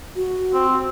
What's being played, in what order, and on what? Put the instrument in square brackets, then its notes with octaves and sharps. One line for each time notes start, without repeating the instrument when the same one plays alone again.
[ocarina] F#4
[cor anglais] C4